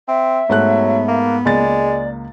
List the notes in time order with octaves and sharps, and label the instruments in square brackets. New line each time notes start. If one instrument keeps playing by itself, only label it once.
[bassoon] C4 [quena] E5
[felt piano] G#2 A3 F#6 [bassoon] F#3 [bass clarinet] B3
[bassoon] A#3
[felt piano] C#2 A#3 A6 [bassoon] G#3 [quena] D5